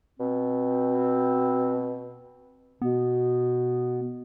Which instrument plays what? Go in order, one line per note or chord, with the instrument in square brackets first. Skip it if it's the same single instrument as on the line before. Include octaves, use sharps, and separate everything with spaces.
[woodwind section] B2 C4
[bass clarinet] B2 [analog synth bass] B3